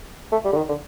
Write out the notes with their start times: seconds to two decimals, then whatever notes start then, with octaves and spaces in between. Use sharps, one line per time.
0.32 A3
0.45 G3
0.53 D3
0.57 D#3
0.69 D3